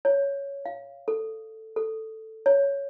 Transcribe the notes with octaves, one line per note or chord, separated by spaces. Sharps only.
C#5
F5
A4
A4
C#5